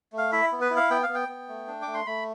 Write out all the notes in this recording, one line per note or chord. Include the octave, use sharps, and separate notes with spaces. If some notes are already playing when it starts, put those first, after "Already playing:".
A3
F5
E4 E5
B3
B4
E4
F5
B3 G5
F5
B3
G5
B3
A3
D4
D6
A3
C6
A3 B5